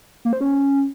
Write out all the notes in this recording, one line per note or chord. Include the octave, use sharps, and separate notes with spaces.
A#3
C5
C#4